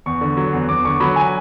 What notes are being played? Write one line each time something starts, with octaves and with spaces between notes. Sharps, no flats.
E2 C#6
D3
F#3
E2
E2 D6
D3 C#6
F#3 B5
G#5